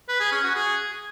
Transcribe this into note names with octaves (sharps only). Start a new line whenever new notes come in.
B4
G#4
C#4
F#4
G#4